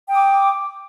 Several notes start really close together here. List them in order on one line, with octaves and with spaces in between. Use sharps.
G5 D#6 D6